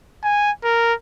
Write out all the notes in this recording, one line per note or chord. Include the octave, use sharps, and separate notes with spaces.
G#5
A#4